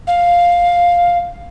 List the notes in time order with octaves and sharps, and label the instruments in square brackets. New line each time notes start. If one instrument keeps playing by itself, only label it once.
[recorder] F5